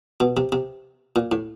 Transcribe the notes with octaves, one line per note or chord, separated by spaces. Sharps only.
B2
C3
C3
A#2
A2